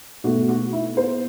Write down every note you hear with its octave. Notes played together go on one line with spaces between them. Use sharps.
B2 A3 F#4
F#4
E4
C5